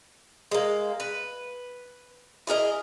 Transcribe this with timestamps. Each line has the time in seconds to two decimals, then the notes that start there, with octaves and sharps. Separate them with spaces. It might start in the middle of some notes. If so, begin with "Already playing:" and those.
0.51 G#3 A#3
1.00 B4
2.47 E4 G#4 A#4 D#5